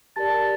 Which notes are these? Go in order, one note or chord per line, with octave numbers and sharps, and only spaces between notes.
G4 A#4 D5 A5 A6
A6